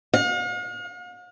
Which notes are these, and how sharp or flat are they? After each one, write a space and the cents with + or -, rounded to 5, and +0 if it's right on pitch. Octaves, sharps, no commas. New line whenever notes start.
F5 +45